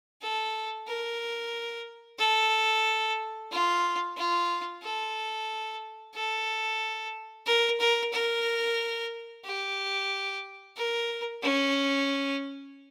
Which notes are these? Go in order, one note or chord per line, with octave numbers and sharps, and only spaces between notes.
A4
A#4
A4
F4
F4
A4
A4
A#4
A#4
A#4
G4
A#4
C#4